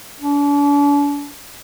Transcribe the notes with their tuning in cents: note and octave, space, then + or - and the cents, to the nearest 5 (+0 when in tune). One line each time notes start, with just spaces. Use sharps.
D4 -40